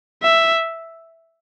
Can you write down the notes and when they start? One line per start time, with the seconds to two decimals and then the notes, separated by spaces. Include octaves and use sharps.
0.23 E5